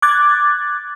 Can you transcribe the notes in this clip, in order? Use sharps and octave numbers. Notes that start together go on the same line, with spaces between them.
D6 F#6 G#6 A6